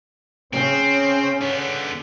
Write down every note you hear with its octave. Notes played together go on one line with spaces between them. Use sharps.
C#3 C4 C#4
D3 B3